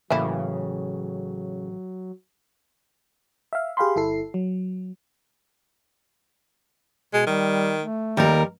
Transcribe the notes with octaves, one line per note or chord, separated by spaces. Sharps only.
A1 C#3 E3 F#3 A#3 E4
E5 F5
G4 G#4 F5 G5 B5 C6
G1 E4 A4 C7
F#3
B2 G#3
D#3 G3
A3
D#2 G3 A#4